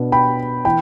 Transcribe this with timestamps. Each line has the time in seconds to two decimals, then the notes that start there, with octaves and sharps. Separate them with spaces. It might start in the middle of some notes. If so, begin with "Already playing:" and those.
Already playing: B2 B3 D4
0.12 G5 B5
0.65 E3 G5 B5